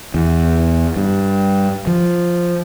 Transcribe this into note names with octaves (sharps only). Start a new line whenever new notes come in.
E2
G2
F3